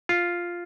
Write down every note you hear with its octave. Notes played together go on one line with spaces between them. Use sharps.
F4